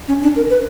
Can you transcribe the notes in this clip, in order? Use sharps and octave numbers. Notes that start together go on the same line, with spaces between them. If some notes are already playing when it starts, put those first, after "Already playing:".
C#4
D4
A#4
B4